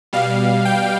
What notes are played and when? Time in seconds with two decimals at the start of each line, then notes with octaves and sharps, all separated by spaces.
0.13 B2 G3 F5
0.65 G5